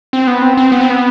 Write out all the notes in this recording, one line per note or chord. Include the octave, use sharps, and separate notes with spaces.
C4
B3
C4
C4
B3
C4
B3